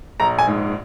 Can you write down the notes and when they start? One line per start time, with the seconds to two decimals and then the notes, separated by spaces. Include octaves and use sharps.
0.20 A#1 A#5
0.39 G#5
0.47 G#2